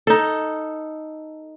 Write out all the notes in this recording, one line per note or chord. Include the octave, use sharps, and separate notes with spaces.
D#4 A4